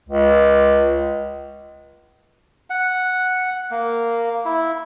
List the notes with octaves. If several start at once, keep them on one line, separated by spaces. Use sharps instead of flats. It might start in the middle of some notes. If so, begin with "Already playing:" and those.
C#2
F#5
A#3
E4